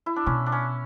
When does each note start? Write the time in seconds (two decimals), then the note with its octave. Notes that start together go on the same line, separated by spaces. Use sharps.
0.06 E4
0.16 D4
0.26 B2 C#4
0.46 D4
0.52 C#4